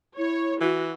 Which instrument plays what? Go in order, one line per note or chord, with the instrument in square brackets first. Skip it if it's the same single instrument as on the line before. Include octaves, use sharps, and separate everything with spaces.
[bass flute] E4 [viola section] C#5
[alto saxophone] E3 [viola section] F#4